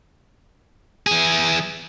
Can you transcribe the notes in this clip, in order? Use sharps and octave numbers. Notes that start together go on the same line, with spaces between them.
E3 G#4